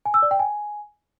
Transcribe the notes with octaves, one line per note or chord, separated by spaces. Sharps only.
G#5
E6
D5
G5
G#5